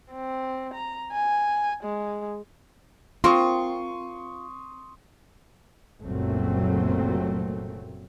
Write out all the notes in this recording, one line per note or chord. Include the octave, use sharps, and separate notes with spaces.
C4
A#5
G#5
G#3
C4 F4 A#4 C6 C#6 D#6
F#1 C2 A#2 F#3 A3 C4